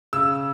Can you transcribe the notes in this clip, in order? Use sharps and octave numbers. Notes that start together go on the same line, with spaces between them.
C#3 E6